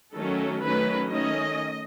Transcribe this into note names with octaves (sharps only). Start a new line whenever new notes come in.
D#3 F#3 A3 C#4 A4
D#3 F#3 A3 C#4 B4
D#3 A3 C#4 D#5